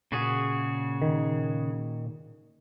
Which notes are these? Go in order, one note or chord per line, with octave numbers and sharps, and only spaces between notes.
A#2 C#3 F#4 G#4
D#3